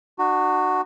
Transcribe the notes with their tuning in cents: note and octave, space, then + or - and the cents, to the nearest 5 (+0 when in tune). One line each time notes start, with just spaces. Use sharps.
D4 +40 F#4 +0